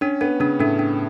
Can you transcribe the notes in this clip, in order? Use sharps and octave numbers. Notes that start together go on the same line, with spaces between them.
C#4 D4
B3 D4
C#3 D4
A2 D4
D4